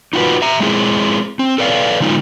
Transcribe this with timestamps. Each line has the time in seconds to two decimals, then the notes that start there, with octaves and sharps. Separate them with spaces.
0.13 D#4 F4 F#4 A4 B4
0.42 E5 A#5
0.60 G#3 C4 E4 G#4
1.39 C4
1.58 A4 B4 D5 F5
2.00 D3 G#3 D#4 F4